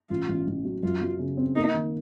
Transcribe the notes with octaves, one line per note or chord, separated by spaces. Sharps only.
A1 F4
A1
A1
F#3
F#2 F4
F#3
C#3
C4
A#3 D#4
D#3